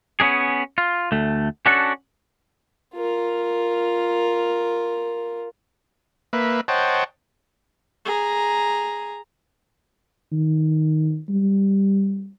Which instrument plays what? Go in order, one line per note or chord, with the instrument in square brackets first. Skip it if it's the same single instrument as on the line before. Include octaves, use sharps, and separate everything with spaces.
[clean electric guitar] B3 C#4 D4 G#4
F4
D2 A3
C#4 D4 F#4 A4
[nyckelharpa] F4 A#4
[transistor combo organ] A#3 B4 E5
C5 C#5 D#5 F#5 G5 A5
[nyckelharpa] G#4 A#5
[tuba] D#3
G3